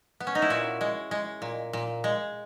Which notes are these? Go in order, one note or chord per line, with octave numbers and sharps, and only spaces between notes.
B3
C#4
D#4
E4
A#2 F#4
G#3
G#3
A#2
A#2
G#3